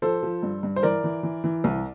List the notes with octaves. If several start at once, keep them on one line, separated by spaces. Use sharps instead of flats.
F3 A4 C5
F3
G2
G2
C5
E3 A#4 D5
E3
E3
E3
C2